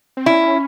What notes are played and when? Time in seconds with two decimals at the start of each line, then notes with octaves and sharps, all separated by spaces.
0.17 C4
0.26 C#4 E4